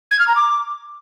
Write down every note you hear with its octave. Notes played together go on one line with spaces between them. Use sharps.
G#6
F6
A#5
D6